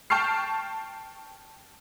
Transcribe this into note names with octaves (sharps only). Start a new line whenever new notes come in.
G5 A5 C#6 F6 C7